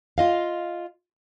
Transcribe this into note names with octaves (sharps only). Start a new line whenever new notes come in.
F4 D#5 F5